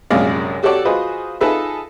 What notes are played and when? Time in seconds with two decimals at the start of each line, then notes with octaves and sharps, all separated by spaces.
0.10 A#1 F#2 C3 G#3 D5 F5
0.63 F#4 G4 A4 C#5 D5 F#5
0.85 F4 F#4 G#4 B4 C5 D#5
1.41 D#4 F4 G#4 A4 B4 E5